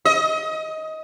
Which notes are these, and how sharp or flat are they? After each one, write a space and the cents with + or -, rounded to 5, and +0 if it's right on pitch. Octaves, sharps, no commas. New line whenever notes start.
D#5 +20